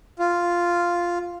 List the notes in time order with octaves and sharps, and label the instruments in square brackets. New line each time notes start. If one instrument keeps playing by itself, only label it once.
[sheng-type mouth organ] F4